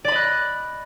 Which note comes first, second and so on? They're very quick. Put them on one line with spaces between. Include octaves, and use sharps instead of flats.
D5 B5 D#5 F#6